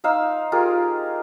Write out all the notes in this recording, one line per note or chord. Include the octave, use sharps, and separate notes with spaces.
D#4 C5 F5 E6
F4 G4 G#4 A#4